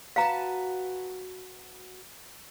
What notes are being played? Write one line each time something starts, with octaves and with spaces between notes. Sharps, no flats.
F#4 B4 F5 A5 A#5